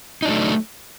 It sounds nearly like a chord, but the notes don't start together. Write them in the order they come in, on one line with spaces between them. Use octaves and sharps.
D#4 D4 F#3 A3